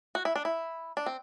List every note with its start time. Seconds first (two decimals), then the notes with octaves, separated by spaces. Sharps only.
0.15 F#4
0.25 E4
0.36 D4
0.45 E4
0.97 D4
1.06 C4